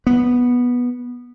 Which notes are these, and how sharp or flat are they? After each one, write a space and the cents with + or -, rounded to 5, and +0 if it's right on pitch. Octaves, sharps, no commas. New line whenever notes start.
B3 -10